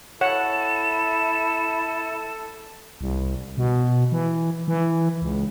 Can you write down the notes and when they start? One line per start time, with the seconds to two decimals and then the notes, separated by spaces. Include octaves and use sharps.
0.21 E4 A4 C#5 F#5 E7
3.01 C2
3.58 B2
4.12 E3
4.68 E3
5.22 C#2